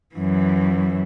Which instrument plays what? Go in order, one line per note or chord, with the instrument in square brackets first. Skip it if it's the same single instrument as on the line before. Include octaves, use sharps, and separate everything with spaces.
[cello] F#2 E3